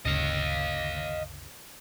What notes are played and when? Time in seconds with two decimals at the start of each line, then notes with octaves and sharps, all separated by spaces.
0.05 G1 D2 C#3 D#5 F5